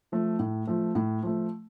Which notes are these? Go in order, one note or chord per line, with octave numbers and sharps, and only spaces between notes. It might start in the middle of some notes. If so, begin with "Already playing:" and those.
F3 A3
A2
F3 A3
A2
F3 A3